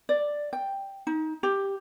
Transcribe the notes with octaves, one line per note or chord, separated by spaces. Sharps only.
D5
G5
D#4
G4